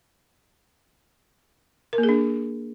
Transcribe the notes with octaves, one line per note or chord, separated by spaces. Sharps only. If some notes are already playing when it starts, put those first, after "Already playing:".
A#4
A#3
G#4
D4